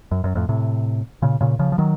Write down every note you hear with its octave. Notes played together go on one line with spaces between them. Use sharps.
F#2
F#2
F2 A2
A2 C3
A#2 C#3
A#2 C#3
C#3 F3
F3
D#3 F#3